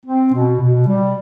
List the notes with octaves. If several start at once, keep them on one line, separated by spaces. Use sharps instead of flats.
C4
B2
B2
G3